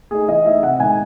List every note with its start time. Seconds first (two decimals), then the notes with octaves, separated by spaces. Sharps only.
0.11 A3 D#4 G#4
0.28 E3 D#5
0.45 A3 D#4 E5
0.63 C3 F#5
0.80 D#3 G#3 D#4 G#5